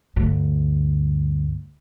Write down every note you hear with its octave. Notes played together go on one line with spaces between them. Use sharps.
D2 G2